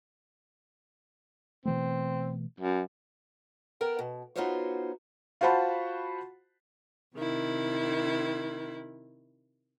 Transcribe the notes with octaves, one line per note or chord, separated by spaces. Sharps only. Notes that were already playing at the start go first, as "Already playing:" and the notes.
B2 E3 A3 C4
F#2
B3 A#4 G5
B2
B3 D#4 F4 F#4 C5 C#5
F4 F#4 C5 F#5 A5 B5
C3 D#3 E4